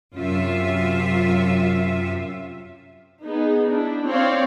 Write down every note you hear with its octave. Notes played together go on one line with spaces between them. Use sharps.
F#2 C3 F4 E5
B3 D#4 G#4
D4 E4
C4 C#5 D5 F5